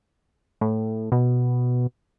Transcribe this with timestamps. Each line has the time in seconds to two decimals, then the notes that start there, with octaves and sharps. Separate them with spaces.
0.61 A2
1.12 B2